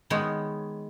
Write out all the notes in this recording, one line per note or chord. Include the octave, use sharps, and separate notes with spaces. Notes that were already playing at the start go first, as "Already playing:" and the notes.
D#3 G#3 B3 C#5